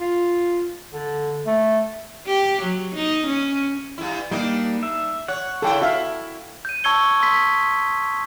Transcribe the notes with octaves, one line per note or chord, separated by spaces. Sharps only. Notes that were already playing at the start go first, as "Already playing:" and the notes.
F4
D3
A3
G4
F#3
D#4
C#4
G2 E4
G3 A#3 D4 D#4
E5
C#5 F#5
C#3 E4 A4 G5
E4 F#4 E5 F5
G6 D#7
A5 C#6 E6 G#6 C#7 G7
C6 D#6 E6 B6